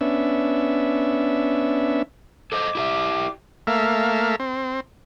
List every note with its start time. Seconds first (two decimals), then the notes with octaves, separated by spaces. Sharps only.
0.01 B3 C#4 D4 E5
2.52 A4 C5 D#5 D6
2.75 E4 G4 E5
3.67 A3 A#3 E5 F5
4.40 C4